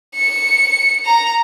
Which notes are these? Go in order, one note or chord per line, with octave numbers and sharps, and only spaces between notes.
C#7
A#5